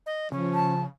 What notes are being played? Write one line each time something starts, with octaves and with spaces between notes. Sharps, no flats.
D#5
C#3 F3 C#4
A5